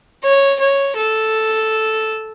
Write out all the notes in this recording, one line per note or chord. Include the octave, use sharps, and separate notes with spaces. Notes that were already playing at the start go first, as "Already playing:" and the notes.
C#5
C#5
A4